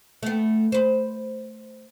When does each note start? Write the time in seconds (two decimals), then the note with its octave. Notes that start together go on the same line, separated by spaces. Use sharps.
0.23 A3 B3
0.72 B4 C5